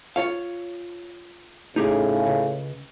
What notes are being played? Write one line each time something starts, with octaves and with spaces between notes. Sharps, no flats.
F4 C#5 F5
A2 C#3 D#4 G4 G#4
C#2